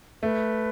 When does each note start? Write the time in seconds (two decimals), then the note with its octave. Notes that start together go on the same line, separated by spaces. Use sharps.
0.23 A3 B4